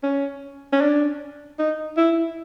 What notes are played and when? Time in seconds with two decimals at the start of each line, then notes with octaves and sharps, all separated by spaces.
0.03 C#4
0.73 C#4
0.81 D4
1.59 D#4
1.97 E4